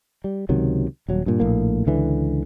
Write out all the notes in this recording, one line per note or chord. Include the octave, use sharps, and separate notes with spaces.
G3
C#2 C3 D#3 F#3
D#1 F#3
G2 A#2
A#1 A2 A#3
C#2 D3 E3